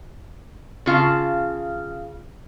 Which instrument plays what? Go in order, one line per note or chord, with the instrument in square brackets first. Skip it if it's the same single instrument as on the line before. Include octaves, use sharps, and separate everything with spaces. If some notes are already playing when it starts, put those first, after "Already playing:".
[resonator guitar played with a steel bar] C#3 F4 F5 A5